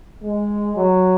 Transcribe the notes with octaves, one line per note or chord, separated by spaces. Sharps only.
G#3
F#3